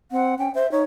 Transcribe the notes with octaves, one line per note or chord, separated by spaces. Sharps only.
C4 F#5
C#4 G5
C5 E5
D#4 C#5